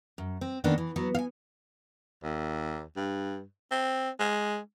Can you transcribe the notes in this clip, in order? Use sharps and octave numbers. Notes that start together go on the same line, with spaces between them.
F#2
C4
D#3 A#3 B3 C#4 D4
E3
F#3 B3
F5 G#5
D#2
G2
C4
G#3